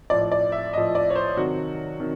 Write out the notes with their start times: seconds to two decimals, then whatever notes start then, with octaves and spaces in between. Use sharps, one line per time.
0.10 A2 F3 D5
0.32 D5
0.52 E5
0.73 A2 F3 D#5
0.95 D5
1.10 C#5
1.16 C5
1.37 C3 D#3 F#3 F#4
1.99 C3 D#3